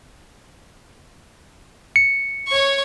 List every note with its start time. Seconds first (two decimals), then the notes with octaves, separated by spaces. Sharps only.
1.96 C#7
2.48 C#5 C#6